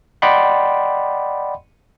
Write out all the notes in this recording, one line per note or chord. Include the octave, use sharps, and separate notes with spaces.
D5 D#5 F#5 G5 B5 C6